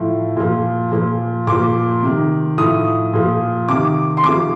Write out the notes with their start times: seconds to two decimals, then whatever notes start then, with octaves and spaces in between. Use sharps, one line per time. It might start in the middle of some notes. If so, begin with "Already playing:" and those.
Already playing: A2 F3
0.37 A#2 F3
0.92 A#2 F3
1.47 A#2 F3 D6
2.02 C3 D#3
2.58 A2 F3 D#6
3.13 A#2 F3
3.69 C3 D#3 D6
4.17 C6
4.24 C3 F3 D6